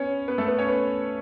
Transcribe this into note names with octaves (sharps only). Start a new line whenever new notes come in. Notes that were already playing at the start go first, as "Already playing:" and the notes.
Already playing: B3 C#4 C#5
B3 B4
A3 A4
B3 B4
C#4 C#5
B3 B4